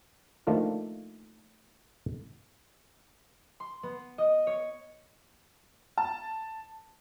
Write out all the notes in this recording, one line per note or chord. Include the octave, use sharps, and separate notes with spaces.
D#3 F3 A3 A#3 D4 F4
C6
B3
D#5
C#5
A5